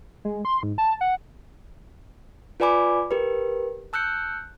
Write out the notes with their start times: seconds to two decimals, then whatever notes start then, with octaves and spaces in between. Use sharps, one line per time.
0.25 G#3
0.45 C6
0.63 G#2
0.78 A5
1.01 F#5
2.60 F4 B4 D5 G#5 B5 D6
3.11 G4 A#4 B4
3.93 A5 E6 F#6 G6 C#7